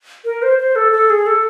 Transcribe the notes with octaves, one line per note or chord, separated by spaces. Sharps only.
A#4
C5
C5
A4
A4
G#4
A4